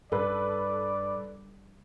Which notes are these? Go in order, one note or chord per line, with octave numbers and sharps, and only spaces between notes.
G2 A4 B4 D5